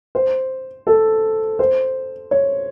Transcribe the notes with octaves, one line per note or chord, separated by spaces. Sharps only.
C5
A4
C5
C#5